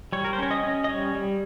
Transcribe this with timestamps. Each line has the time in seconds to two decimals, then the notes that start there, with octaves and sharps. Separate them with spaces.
0.13 G3 C#5
0.24 A#4
0.33 C5
0.38 C#4 C#5
0.51 D#5
0.63 C#4
0.84 D#5
0.89 G3 C#5
1.15 G3